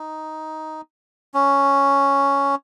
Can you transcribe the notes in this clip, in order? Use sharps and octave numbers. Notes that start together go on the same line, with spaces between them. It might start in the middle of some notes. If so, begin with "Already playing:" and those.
Already playing: D#4
C#4